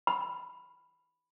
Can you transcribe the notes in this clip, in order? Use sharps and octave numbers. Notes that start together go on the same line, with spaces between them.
B5